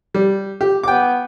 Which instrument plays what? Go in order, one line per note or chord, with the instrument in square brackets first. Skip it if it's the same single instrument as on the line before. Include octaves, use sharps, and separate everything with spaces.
[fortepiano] G3
G4
[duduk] B3 [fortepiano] G5 D6